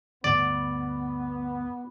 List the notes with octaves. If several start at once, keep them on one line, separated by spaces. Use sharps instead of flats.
G1 D2 B3 D5